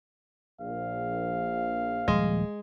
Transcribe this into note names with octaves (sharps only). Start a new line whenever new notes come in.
A#1 F5
D#1 F3 G3 G#3